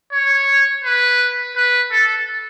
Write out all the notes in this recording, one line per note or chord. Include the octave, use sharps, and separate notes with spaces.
C#5
B4
B4
A4